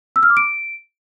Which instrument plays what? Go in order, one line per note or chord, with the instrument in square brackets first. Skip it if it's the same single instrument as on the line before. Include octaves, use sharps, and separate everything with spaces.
[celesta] E6
F6
D6
D7